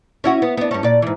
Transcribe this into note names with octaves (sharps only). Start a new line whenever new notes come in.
C#4 E4 F#4
B3
B3 D4
G2 C#4
A#2 D5
G#2 E3